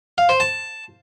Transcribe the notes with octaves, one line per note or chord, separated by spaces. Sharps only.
F5
C5
A5